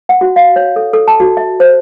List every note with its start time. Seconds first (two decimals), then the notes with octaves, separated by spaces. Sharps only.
0.09 F#5
0.21 F#4
0.36 F5
0.56 C#5
0.76 A4
0.93 A4
1.08 A5
1.20 F#4
1.37 E5
1.60 C5